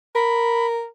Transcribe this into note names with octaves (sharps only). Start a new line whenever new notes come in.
A#4 B5